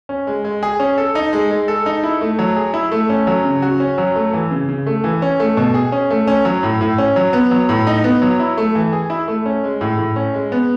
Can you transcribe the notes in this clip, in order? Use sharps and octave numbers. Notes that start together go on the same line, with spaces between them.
C#4
G#3
G#3
G#4
C#4
A4
D#4
G#3
G#3
A4
D#4
E4
A3
F#3
G#4
E4
A3
C#4
F#3
C#3
F#4
C#4
F#3
A3
E3
C#3
C#3
A3
E3
C#4
A3
B2
G#4
C#4
A3
C#4
F#3
A2
A2
C#4
F#3
B3
F#3
A2
D#4
B3
F#3
E4
A3
E3
G#4
E4
A3
C#4
G#3
A2
A2
C#4
G#3
B3